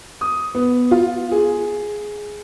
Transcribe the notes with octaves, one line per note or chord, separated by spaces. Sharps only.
D#6
B3
F4
G#4